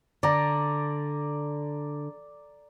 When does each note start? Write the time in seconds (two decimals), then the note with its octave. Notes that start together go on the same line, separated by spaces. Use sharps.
0.23 D3 D5 A#5